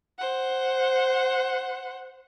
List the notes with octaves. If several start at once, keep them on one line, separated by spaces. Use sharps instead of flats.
C5 F#5